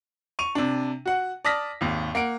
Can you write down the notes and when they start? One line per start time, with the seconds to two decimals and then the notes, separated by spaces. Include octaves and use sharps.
0.39 C#6 D#7 F7
0.55 C3 D4
1.06 F#4 F#5
1.45 D5 A5 D#6 F6 A#6 B6
1.81 G#1 D#2
2.15 A#3 F#5 D7